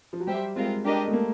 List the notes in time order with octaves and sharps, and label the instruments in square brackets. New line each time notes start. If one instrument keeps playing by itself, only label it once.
[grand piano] F3
F#3
[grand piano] G3 [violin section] G4 C5 E5
[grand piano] G#3 [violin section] C4 F4 A#4
[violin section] D4 G4 A#4 D#5
[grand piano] A3
A#3